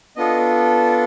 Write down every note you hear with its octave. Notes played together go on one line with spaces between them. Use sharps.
B3 D4 F4 A4 D#5